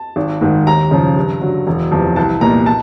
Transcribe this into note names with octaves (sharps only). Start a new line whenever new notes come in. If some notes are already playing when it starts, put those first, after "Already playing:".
Already playing: A5
G#1
G#2 D#3
D#2 A#5
C#3 F3
G2
D3 F#3
E1
E2 C3 F3
C2 A5
A#2 G3 B3 A#5
A5